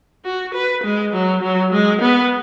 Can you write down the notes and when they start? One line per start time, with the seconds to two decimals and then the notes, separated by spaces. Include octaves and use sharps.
0.25 F#4
0.54 B4
0.84 G#3
1.13 F#3
1.42 F#3
1.73 G#3
2.01 B3